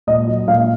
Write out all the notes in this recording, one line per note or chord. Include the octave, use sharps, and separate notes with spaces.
A#2 D#5
F#3
A#2 F5